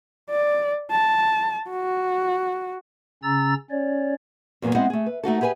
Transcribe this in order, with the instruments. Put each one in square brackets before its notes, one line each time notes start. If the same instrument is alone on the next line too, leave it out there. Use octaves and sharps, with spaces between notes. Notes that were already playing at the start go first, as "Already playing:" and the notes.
[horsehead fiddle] D5
A5
F#4
[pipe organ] C#3 C#4 A#5 E6 A6
C#4 C#5 D5
[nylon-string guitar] E2 A#2 F3 F#3 B3
G#3 B3 C4 E4 D#5 F#5
A3 G#4
B4
A3 D#4 F#4 A4
G4 G#4 B4 D#5 G#5